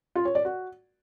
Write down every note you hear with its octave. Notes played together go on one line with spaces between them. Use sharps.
F4
C#5
D5
F#4